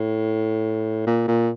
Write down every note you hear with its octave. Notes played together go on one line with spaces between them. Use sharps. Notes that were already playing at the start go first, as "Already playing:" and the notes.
Already playing: A2
A#2
A#2